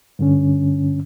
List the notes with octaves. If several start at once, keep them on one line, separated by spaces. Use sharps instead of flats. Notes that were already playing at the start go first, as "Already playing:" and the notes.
G2 D3 C#4